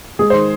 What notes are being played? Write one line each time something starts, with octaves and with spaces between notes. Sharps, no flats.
G#3 G#4
D#3 C5